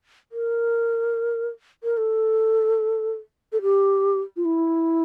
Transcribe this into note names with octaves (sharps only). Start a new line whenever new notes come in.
A#4
A#4
A4
A4
G4
F4
E4